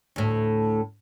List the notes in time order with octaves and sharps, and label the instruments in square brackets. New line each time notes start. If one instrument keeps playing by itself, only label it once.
[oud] D2 A2